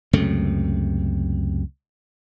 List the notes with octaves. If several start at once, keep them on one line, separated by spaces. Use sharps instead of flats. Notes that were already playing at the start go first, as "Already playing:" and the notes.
C#2 F#2 C3 A3